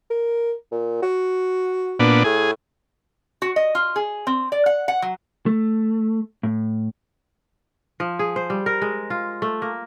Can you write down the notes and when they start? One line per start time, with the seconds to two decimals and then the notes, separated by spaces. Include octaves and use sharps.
0.10 A#4
0.72 A#2
1.02 F#4
1.99 A#2 B3 D4
2.24 A2 G#4
3.42 F#4
3.56 D#5
3.75 F4
3.96 G#4
4.27 C4
4.52 D5
4.66 F#5
4.88 F#5
5.02 F#3
5.46 A3
6.43 A2
8.00 F3
8.19 G#4
8.36 C5
8.50 G3
8.66 A#4
8.82 G#3
9.10 F4
9.42 A3
9.62 A#3